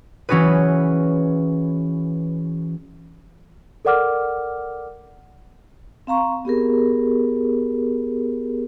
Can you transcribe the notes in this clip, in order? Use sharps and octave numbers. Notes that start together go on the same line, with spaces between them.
E3 C#4 F#4 G#4 B4
A4 A#4 D5 F#5 D6 F6
C4 F5 A#5 C#6
B3 G4 G#4 A#4